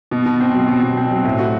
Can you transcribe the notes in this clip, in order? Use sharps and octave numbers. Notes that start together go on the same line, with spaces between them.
B2
B2
C4
F#3
B2
B2
C4
F#3
A2
F#4